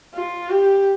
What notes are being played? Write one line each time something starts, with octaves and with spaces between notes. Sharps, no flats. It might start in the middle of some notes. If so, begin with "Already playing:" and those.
F4
G4